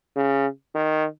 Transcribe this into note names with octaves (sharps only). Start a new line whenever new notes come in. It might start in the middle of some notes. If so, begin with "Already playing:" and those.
C#3
D#3